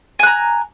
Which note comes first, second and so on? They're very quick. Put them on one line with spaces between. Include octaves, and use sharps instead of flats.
G#5 F#6 A#5